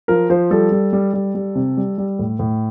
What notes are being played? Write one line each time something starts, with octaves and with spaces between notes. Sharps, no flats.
F3 A#4
F3 C5
G3 A4
G3
G3
G3
G3
C3
G3
G3
A2
A2